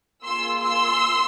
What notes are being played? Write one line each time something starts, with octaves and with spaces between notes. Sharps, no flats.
A#3 F4 G#4 C6 E6
C6 E6